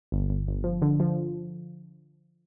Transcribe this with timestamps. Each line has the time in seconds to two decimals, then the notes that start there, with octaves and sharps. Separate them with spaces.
0.12 G1
0.30 G1
0.47 G1
0.64 F3
0.82 D3
1.00 F3